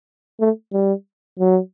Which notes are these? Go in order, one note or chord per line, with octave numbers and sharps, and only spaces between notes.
A3
G3
F#3